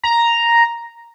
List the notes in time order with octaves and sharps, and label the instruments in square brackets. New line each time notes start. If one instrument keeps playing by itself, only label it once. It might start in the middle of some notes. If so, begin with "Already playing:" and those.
[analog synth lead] A#5